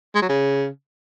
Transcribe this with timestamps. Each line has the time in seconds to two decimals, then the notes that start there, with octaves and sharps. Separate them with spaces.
0.15 G#3
0.22 F#3
0.29 C#3